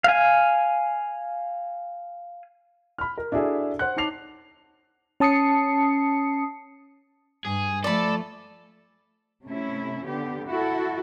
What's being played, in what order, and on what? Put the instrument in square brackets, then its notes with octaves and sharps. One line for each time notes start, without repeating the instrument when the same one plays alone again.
[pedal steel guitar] F5 G#5
[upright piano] B5 F6
A#4
D4 E4 F#4 G#4 A4 E5
C5 F#5 F#6
D#4 C#5 A5 D6 C7 F7
[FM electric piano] C#4 A5 D#6 C7 C#7
[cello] G2 [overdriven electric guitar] G#4
[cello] F3 A3 [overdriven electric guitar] A4 [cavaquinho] D5 B5
[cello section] C3 A3 C#4 E4
D3 B3 G4
E4 F#4 A4